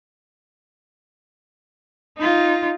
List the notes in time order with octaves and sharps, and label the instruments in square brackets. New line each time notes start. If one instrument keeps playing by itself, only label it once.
[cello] D#4 F4